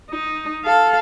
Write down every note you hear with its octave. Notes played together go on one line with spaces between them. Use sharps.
D#4
A4 F5